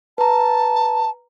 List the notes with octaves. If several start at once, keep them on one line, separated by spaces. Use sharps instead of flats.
B4 A5 A#5